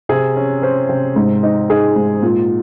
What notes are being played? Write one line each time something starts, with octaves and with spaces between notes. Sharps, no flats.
C3 G#4
C#4
C#4 C5
C3
G#2
D#4
D#4 G#4
G#2
A#2